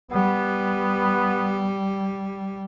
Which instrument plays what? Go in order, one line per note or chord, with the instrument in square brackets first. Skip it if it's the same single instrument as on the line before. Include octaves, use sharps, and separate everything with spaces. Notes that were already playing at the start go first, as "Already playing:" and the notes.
[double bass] G3 [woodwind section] B3